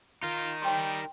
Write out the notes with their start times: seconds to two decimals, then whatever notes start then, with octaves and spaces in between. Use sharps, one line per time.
0.23 D#4 F4 A#4
0.62 G3 C#5 G5 C6